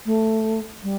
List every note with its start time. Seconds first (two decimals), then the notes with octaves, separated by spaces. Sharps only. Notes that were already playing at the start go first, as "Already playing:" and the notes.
0.05 A3
0.83 G3